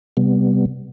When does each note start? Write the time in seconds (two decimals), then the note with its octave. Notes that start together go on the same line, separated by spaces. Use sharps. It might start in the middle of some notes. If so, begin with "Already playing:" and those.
0.17 C3 G3 B3